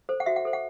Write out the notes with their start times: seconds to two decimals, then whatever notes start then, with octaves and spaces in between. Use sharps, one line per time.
0.09 A4 C5
0.20 F#5
0.26 F#4 E5
0.36 F#5
0.45 A4 C5
0.53 F#5